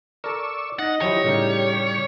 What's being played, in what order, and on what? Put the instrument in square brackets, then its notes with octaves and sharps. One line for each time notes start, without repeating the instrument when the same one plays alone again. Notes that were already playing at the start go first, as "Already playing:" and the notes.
[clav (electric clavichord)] A4 A#4 [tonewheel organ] D5 C#6 E6
[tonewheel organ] D#4 [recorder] D#5 [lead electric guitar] F#5
[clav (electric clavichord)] F3 F#3 E4 [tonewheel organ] G4 [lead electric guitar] C#5
[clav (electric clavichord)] A2 C#3 D#4 [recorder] G3